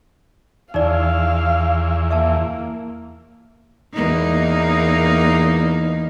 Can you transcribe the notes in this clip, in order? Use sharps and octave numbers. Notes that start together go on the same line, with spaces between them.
E2 D#4 D5 F5
A#3 E5 F5 A5
E2 A#3 D#4